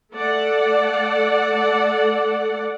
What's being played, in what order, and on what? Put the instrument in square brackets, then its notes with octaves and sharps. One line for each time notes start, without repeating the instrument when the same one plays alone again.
[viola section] A3 A4 D5 F#5